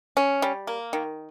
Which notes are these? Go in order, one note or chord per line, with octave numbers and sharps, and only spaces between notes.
C#4
G3
A#3
D#3